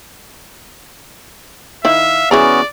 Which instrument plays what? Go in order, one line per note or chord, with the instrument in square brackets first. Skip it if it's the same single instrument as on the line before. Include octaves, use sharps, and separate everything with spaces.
[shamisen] D#3 E4 [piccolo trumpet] E5 [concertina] F5
[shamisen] E3 G#4 A#5 [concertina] B3 C#4 F#4 [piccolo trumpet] D5